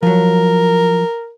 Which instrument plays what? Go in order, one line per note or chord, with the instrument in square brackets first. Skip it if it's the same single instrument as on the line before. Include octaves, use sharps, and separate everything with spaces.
[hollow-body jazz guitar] F3 F#3 [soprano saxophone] A#4